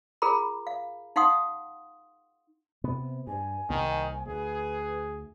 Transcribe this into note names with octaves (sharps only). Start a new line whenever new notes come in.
F4 G#4 A#4 A#5 B5
F5
D#4 F5 F#5 C6 D#6
C3 B3
G2 G#5
C2 D#3 A#3
D2 G#4 B4